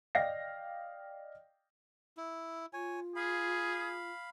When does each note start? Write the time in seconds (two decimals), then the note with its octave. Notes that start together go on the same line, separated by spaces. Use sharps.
0.15 D5 D#5 F5 G5 A#6
2.17 E4
2.73 F4 C#5 G#5
3.16 G#4 F5 B5